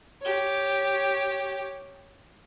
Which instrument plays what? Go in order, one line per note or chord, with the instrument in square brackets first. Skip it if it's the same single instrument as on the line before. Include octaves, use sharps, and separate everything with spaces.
[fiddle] G4 C#5